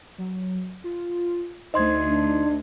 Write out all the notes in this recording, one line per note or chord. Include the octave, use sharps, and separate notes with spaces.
F#3
F4
D2 D#4 C5 D#5 C6 G#6
D4